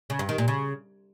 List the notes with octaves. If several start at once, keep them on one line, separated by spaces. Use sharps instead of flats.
C#3
G2
D#3
A#2
C#3